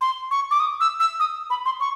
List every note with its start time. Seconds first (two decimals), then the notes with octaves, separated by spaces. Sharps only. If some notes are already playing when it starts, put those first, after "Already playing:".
0.01 C6
0.31 C#6
0.51 D6
0.60 D#6
0.80 E6
1.00 E6
1.20 D#6
1.50 B5
1.65 C6
1.80 C#6